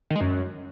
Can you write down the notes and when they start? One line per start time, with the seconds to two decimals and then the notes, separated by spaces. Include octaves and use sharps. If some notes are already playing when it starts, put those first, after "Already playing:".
0.10 D#3
0.16 G#3
0.21 F#2